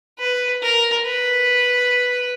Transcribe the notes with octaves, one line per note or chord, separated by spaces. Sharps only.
B4
A#4
B4